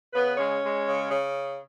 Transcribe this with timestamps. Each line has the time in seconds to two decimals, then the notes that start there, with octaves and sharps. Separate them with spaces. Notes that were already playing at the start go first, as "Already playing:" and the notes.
0.13 C#3 B3 B4
0.37 G#3 C#4 C#5
0.62 G#3
0.86 C#3
1.10 C#3